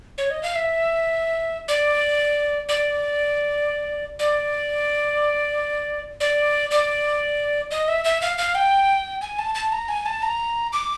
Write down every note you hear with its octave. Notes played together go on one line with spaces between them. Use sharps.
C#5
D#5
F5
E5
D5
D5
D5
D5
D5
D#5
E5
E5
F5
F5
G5
G#5
A5
A5
A#5
G#5
A5
A#5
D6